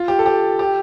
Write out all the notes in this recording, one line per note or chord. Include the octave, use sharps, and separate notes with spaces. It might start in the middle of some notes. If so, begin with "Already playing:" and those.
Already playing: F4
G4
A4
G4
G4